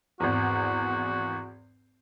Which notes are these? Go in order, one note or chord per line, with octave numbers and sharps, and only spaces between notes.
G#1 E2 F#4